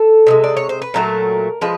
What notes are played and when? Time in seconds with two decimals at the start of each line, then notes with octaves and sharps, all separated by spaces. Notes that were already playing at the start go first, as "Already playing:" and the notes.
Already playing: A4
0.27 C3 D#3 G#3
0.44 D5
0.57 C#5
0.69 C5
0.82 B4
0.94 A#2 F#3 A3 A#4
1.61 F3 G#3 B4